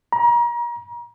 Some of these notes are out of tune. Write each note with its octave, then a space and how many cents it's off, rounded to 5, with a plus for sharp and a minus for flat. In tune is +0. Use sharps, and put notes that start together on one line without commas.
A#5 +35